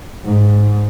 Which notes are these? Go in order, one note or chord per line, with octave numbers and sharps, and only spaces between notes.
G#2